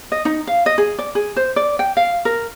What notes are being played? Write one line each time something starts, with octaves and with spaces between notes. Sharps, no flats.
D#5
D#4
F5
D#5
G#4
D5
G#4
C5
D5
G5
F5
A#4